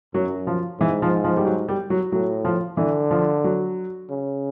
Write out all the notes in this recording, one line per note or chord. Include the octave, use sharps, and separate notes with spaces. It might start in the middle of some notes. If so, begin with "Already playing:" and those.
F#2 F#3
F3
G#2 E3
F3
F3
G3
F#3
G3
F#3
A2 F#3
F3
D3 E3
F3
F#3
C#3